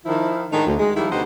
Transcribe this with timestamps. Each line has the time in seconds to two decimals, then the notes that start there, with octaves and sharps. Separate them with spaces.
0.06 D#3 F3 E4
0.53 A2 D#3 G#3 A3 D4 D#4
0.67 D2
0.79 G#3
0.96 D#3 F3 G3 E4
1.12 D2 B2 D#4 G4 C5 F#5